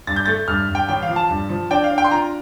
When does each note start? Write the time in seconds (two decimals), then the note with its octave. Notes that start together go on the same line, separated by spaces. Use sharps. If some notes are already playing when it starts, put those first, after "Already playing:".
0.07 G2 A6
0.16 G6
0.26 A3 A6
0.48 G2 F6
0.69 G2
0.75 G5
0.89 A1 G5
1.03 F5
1.09 F3
1.16 A5
1.30 G2
1.49 F3
1.71 D4 G5
1.84 F5
1.91 D4
1.98 G5
2.04 C6
2.11 F4 A#5